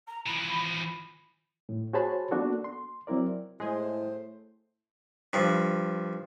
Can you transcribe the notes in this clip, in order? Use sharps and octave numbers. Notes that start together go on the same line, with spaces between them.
A#5
E3 F3 B5
A2
F#4 G#4 C5 C#5 A5 B5
A#3 B3 D4 F#4 A4
C6
F#3 C4 E4 A#4 D5
A2 G#3 A3 G#4 C5
G2 F3